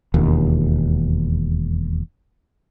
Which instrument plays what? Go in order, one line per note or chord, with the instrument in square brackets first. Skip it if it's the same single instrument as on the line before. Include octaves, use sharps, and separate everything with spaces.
[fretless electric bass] E1 D#2